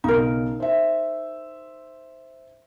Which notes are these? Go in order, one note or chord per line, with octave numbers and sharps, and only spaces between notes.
B1 C#3 D#4 A#4
C5 E5